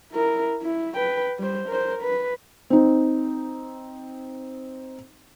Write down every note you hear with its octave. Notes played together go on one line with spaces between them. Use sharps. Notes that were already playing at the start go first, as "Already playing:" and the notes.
E4 A#4
E4
B4 G5
G3 C5
A#4 C5
B4
C4 D#4